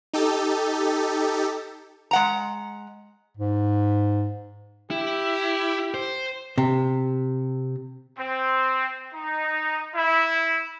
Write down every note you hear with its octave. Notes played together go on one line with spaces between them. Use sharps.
D#4 G4 A4
G#3 F#5 A#5
G#2
E4 G4
C5
C3
C4
D#4
E4